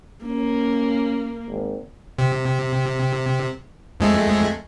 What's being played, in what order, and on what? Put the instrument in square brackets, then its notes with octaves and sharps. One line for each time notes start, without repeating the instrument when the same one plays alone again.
[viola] A#3 [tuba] C#4
[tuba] G#1
[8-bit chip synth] C3
F2 G#3 A3